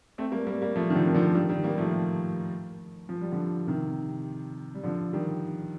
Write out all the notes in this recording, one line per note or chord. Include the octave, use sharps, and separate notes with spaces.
A3 C4
G3 A#3
G3 A#3
G3 A#3
F3 A3
D#3
D3 F3
D#3
D3 F3
D#3 G3
D#3 G3
G3 A#3
G3
F3 A3
F3
G3
D3 F3
C3 D#3
G3
D3 F3
D#3 G3